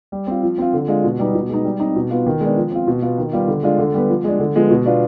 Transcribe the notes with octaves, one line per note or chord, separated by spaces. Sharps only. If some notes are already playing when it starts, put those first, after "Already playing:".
G3
C4 F4
F3
C4 F4
D3
G#3 D4 F4
B2
G3 B3 D#4
B2
G#3 B3 D#4
G3
C4 D#4
B2
B3 F4
D#3
G#3 B3 D4
F3
C4 F4
B2
B3 F4
D#3
G3 B3 F4
D3
G#3 D4 F4
D3
G3 B3
F3
G#3 D4
D3
F3 G#3 B3
B2
B3 D4 F4